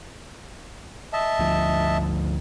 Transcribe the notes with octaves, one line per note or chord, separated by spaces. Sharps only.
D#5 E5 A5
D2 F3